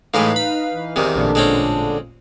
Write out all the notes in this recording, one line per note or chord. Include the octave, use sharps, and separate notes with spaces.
A2 E3 G#3 D#4 B4 F5
B5
E3
E2 C3 D#3
A1 A#2 D3 D4
G#3 C4 C#4